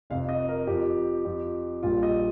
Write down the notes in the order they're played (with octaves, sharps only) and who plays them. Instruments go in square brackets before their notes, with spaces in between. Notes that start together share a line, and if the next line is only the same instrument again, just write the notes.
[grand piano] F1 F2 C3 F5
D#5
A#4
F2 F3 G4
F2 F3
A#1 A#2 G3 F4
D#5